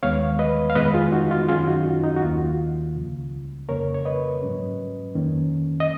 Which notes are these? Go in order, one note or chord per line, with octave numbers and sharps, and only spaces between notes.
D#2 D#3 G#3 B3 C#5 F5
B4 D#5
F5
F2 D#3 G#3 B3 B4 D#5
F4 G#4
D#4 F#4
F4
F#2 D#3 F#3 C#4 F4 G#4
D#4 F#4
F4
D#4
F#4
D#2 D#3 A#3 F4
C#2 C#3 F3
F2 C#3 F3 A#3 A#4 C#5
C#5
B4 D#5
G#2 F#3 C#4
F2 D#3 A#3 C#4
D#5